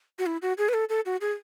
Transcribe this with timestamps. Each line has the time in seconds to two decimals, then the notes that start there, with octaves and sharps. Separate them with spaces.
0.19 F#4
0.26 E4
0.42 F#4
0.58 G#4
0.69 B4
0.74 A4
0.89 A4
1.06 F#4
1.21 G#4